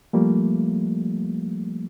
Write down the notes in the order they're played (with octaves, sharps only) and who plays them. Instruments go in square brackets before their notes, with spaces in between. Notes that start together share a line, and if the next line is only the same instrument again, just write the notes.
[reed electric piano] F3 G3 A3 A#3